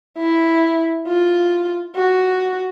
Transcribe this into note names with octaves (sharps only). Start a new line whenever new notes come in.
E4
F4
F#4